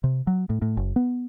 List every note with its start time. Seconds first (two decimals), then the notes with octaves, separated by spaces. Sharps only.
0.04 C3
0.27 F#3
0.50 A2
0.62 A2
0.77 F#1
0.96 B3